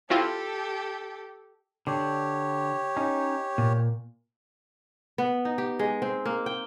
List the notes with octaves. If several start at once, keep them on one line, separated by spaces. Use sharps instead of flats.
C4 E4 F4 G4 A4
D3 G4 C#5
C#4 D#4
A#2
B3
D#4
G4
G#3
C4
A#3
G5